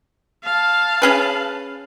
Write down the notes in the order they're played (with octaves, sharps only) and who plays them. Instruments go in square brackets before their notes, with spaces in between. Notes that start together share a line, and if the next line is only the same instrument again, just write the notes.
[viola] F5 A5
[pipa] C#4 G#4 B4